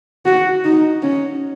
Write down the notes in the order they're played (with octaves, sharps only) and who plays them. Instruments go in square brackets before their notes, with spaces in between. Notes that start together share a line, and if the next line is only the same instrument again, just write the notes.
[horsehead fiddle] F#4
D#4
C#4